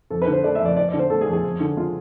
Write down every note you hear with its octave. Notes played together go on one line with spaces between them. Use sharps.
F2 A4
B4
D3
C5
A3 D5
E5
F2 D5
F2 D5
D5
D3
C5
A3 A4
G#4
F2
G#4
F2
D3
G#3 F4